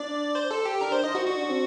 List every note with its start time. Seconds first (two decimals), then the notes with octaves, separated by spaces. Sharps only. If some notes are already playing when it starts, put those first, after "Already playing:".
Already playing: D4 D5
0.35 C5
0.51 A4
0.65 G4
0.81 D4 A#4
0.92 C5
1.03 D#4 D#5
1.15 F#4
1.27 D4 F#4
1.44 D4
1.50 C4